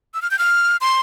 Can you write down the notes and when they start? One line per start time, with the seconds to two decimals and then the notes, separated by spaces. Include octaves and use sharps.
0.14 E6
0.22 F6
0.31 G6
0.39 F6
0.81 C6